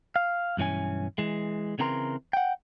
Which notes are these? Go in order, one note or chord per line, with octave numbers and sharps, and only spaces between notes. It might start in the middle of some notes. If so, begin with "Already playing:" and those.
F5
B1 G2 E3 C#4 G#5
E3 G#3
C#3 E3 C4 A#4 A#5 C6
F#5 G5